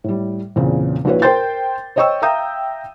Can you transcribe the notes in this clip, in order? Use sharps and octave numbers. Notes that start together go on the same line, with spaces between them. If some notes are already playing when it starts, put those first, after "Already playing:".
A2 G3
E2 A#2 C#3 C4
A#1 A#2 E4 F#4 B4 C#5
A#4 C5 G5 C6 G6 A6
C5 C#5 D#5 G5 C#6 E6
E5 F5 G5 A#5 D#6 G6